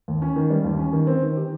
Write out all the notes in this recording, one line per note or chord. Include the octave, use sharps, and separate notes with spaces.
D#2
C#4
D#3
G3
D#2
C#4
D#3
C4
D#3
G4